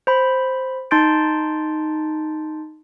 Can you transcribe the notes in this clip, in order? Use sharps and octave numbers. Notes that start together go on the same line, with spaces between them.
C5 B5
D#4 A5 C6 G6 A6 D7